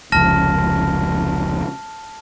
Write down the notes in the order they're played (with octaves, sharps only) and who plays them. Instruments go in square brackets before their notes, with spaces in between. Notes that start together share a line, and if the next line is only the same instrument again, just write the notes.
[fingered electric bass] F1 C#2 F3 [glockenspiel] A5 F6 A#6